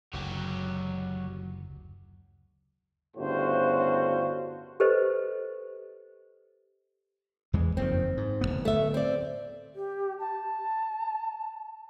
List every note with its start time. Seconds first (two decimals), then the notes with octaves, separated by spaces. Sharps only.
0.13 F#1 D2 F#3 G4
3.16 G1 A2 C#3 F4 F#4 C5
4.80 G4 A4 B4 C5 D#5
7.53 E2 E3 G#3
7.77 F#1 F2 D#3 C4
8.17 G#2
8.41 D1 F#2 B3
8.65 A3 E5
8.94 C4 D5
9.75 G4
10.19 A5